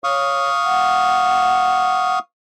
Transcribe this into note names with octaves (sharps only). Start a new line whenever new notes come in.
C#5 F5 C#6 D#6
F#5